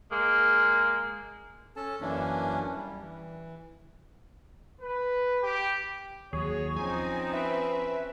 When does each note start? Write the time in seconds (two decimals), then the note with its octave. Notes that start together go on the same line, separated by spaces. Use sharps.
0.11 G#3 A#3
1.76 C#4 A4 A5
2.01 F#2 E3 A#3 C#4 D4
2.75 G3
3.01 E3
4.81 B4
5.43 G4
6.33 D#2 F#3 G#4 C#5
6.76 F3 C4 C#4 D#4 G#5
7.33 B4 E5